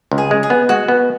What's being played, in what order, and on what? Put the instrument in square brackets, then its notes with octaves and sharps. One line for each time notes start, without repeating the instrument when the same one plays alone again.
[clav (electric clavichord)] C#2
[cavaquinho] G#4
[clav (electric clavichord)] G#3
[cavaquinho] G#4
[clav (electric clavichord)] B3
[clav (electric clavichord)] G#3 [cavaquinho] F#4
[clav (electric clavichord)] B3